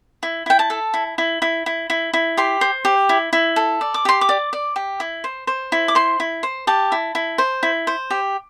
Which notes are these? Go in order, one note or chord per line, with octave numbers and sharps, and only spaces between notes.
E4
E4 G5
A5
A4
E4
E4
E4
E4
E4
E4
G4 C6
C5
G4
E4
E4
A4
D5
D6
G4 C6
D6
D5
D5
G4
E4
C5
C5
E4
D6
C5 C6
E4
C5
G4 A5
E4
E4
C5
E4
C5
G4